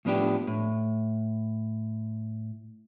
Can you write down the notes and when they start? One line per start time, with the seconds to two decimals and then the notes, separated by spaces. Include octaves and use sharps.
0.05 A2 F3 B3 D4 G4
0.47 A2